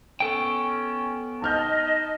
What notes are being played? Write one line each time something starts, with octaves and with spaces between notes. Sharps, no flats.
B3 C#4 A4 G5
D#4 D#5 A5 F6 G6